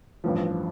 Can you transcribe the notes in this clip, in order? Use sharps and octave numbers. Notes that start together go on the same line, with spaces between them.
A1 G2 F3